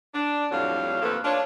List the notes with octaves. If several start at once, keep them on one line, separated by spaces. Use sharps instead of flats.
D4
F2 A2 F#3 G3 F#4 F5
D#2 F3 A3 A#3 A4 B4
D4 F4 C#5